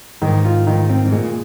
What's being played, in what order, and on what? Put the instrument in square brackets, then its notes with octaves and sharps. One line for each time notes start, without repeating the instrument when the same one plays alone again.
[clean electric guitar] G#2 [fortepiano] D#3
[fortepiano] F4
D#3
C4
[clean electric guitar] G#2
[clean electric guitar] A#2 [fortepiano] G#3